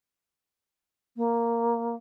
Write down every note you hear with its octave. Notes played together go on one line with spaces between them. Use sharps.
A#3